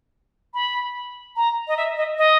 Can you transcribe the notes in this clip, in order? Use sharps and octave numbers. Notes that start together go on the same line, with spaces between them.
B5
A#5
D#5
E5
D#5
D#5